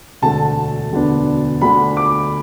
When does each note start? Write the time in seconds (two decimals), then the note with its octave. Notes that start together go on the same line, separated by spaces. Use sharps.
0.22 E1 D2 D3 A3 D4 A5
0.92 E1 D2 D3 B3 D4
1.61 D2 D3 A3 D4 B5
1.97 D6